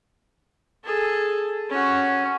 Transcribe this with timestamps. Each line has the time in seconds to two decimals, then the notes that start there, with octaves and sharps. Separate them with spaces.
0.84 G#4 A4
1.69 C#4 F#4